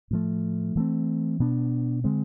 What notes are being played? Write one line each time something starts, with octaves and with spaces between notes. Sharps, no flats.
A2 F3 A3
E3 A3 C4
B2 B3 D4
D3 G#3 C4